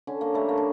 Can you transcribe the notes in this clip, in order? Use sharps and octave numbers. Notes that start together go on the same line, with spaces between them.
D3 C#4
A#3
G3 A3
A#3
D4